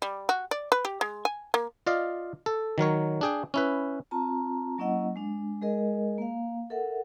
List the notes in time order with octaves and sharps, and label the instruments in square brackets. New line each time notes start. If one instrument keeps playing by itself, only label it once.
[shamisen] G3
F#4
D5
B4
G4
G#3
G#5
A#3
[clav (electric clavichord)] F4 D5 D#5 F5
A4
D#3 F#3 A#4 C#5
D4 G#4 G5
C#4 E4 B4
[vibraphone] C4 F4 A5 A#5
F#3 A#3 C#4 E4 D#5 F#5
G#3 D4
G#3 G#4 A#4 D#5
A#3 F5
A4 A#4 E5 F#5